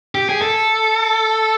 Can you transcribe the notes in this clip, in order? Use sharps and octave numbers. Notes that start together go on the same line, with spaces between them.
G4
G#4
A4